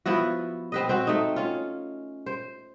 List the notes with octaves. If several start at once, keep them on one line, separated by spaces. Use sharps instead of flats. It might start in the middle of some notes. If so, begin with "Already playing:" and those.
F3 B3 E4 F#4
C4 B4 D#5
C4 F#4
A3 D#4
C#4 F4
C5